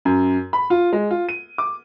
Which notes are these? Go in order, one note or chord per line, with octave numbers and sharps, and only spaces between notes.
F#2
B5
F4
G#3
F4
D#7
D6